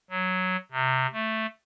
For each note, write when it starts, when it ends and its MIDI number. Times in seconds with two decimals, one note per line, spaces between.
0.10 0.57 54
0.72 1.07 48
1.12 1.46 57